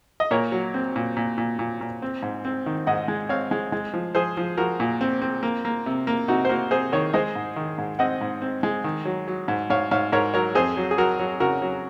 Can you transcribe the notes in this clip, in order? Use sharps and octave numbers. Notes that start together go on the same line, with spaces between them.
D#5
A#2 A#4 C#5
F#3
C4
A#2
A#2
A#2
A#2
A#2
C4
G#2
C4
D#3
G#2 D#5 F#5
G#3
C4 C#5 F5
G#3
G#3
F3
F3 G#4 C5
F3
F3 F#4 A#4
A#2
C4
C4
A#3
A#3
C3
A#3
C3 D#4 F#4
C5
A#3 F#4 A#4
C3 G#4 C5
D#3 A#4 C#5
G#3 C5 D#5
G#2
D#3
G#2
C4 D#5 F#5
G#2
C4
G#3
D#3
F#3
F#3
G#2
G#2 C#5 F5
G#2 C#5 F5
G#2 A#4 C#5
F#3 A#4 C#5
F2 G#4 C5
F#3
G#4
F#3 F#4 A#4
F#3
C#3 F#4 A#4
F#3